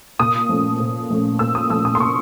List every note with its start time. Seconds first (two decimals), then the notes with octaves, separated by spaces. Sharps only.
0.19 A#2 D#6
0.49 F3 A3 C#4
0.80 A#2
1.10 F3 A3 C#4
1.39 A#2 E6
1.55 D#6
1.70 F3 A3 C#4 E6
1.85 D#6
1.95 C6
2.00 A#2 C#6